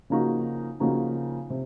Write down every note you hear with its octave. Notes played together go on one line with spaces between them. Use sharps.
C#3 F3 A#3 D#4 F#4
C#3 F3 A#3 D#4 F#4
C3